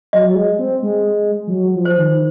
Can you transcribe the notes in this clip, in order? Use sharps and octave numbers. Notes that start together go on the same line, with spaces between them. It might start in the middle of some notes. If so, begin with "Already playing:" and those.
F#3 D#5
F#3
G#3
C4
G#3
F3
F#3
F3
C5
D#3
D#3